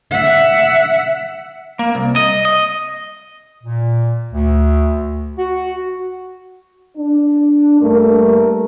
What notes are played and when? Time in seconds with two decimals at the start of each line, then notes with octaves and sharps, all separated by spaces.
0.11 E5 F#5
1.79 A#3
1.95 C2
2.16 D#5
2.45 D#5
3.64 A#2
4.32 D2
5.38 F#4
6.97 D4
7.81 G2 A3 A#3 A#4